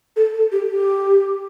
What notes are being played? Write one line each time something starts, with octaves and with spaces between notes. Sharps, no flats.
A4
A4
G4
G4